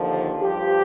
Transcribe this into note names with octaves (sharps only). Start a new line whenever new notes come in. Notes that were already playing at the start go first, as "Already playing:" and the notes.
Already playing: D#2 D3 F3
G2 F3 G4